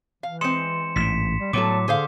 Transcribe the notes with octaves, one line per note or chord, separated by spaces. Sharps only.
E3 F5
G#3 C4 C6 C#7 E7
A1 G#2 B6 E7
G3
A2 F#3 G3 B3 A4 D6
D3 G#4 C5 F5